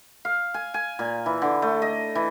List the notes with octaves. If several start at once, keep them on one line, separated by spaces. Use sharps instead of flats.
F5
G#5
G#5
A#2
E3
D3
A3
D#5
E3